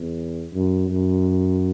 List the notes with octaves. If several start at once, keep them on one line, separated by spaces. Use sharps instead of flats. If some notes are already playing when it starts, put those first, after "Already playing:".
Already playing: E2
F#2
F#2